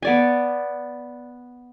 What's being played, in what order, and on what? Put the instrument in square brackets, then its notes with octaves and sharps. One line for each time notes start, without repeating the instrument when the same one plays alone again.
[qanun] B3 D5 G#5